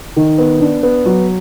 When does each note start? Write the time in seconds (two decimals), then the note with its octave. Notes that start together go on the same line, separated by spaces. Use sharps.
0.16 D#3
0.38 B3
0.60 D4
0.83 B3
1.06 F#3